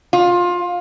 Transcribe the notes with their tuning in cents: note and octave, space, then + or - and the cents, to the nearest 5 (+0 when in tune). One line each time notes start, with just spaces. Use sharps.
F4 +20